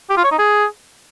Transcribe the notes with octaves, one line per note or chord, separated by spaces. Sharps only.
G4
F4
C#5
D#4
G#4